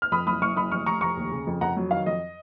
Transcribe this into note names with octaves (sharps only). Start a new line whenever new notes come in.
F6
F2 B5 D#6
F#1 B5 D#6
F#1 C#6 F6
F#1 B5 D#6
F1 C#6 F6
F1 A#5 C#6
F1 A#5 C#6
D#2
C#3
F2
F2 F#5 A#5
F#3
D#3 F5
F2 D#5